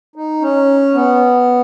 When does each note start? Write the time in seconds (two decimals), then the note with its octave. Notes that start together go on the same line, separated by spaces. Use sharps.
0.16 D#4
0.41 C#4
0.94 B3